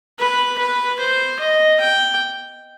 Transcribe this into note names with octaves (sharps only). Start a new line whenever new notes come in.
B4
B4
C5
D#5
G5